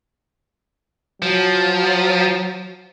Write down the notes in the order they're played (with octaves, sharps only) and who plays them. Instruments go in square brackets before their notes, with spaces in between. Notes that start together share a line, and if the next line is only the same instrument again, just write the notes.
[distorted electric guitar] F3 [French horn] F#3